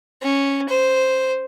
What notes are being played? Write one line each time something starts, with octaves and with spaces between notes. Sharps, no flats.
C#4
C5